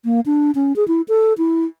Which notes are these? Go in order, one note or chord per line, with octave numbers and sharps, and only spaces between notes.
A#3
D4
C#4
G#4
E4
A4
E4